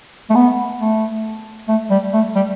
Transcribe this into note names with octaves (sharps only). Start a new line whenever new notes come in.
A3
B3
A3
A3
G3
A3
G3